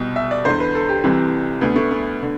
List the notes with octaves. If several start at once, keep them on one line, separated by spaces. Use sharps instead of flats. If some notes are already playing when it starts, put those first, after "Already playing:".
Already playing: C2 B2
E5
D5
E2 D3 C5
B4
A4
G4
C2 C3 E3 C4
D2 D3 B3
A3
B3
D3